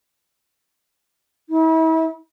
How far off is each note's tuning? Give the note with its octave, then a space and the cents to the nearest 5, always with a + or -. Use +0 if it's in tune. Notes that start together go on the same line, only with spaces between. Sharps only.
E4 -40